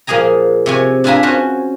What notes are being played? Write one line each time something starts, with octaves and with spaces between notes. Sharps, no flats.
A#2 F3 A#3 G#4 G#5 A#5
C3 C#5 G#5
D4 F4 E5 G#5 A#5 B5
C#4 F#4 C5